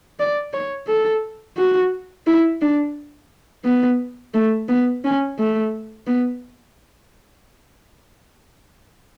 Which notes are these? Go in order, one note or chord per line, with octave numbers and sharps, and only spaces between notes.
D5
C#5
A4
F#4
E4
D4
B3
A3
B3
C#4
A3
B3